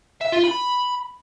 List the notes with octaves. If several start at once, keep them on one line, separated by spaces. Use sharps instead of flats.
E5
F4
B5